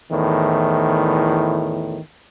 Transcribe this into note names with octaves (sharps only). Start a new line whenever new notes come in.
E2 A2 D#3